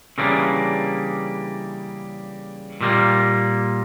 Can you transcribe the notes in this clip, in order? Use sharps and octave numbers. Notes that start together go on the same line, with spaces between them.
C#3 E3 G3 A#3 D4
A#2 G3 A#3